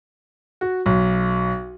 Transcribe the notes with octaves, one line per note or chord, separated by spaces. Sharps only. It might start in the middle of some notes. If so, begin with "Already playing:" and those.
F#4
B1